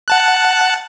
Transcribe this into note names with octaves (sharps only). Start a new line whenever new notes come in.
F#5 A5 F#6